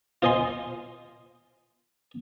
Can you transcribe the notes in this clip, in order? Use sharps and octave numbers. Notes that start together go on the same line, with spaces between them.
F4 C5 D#5 G#5 C6